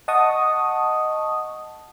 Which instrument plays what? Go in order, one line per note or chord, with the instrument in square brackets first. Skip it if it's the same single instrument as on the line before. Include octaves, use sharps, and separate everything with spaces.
[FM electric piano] D#5 F#5 A5 C#6 D#6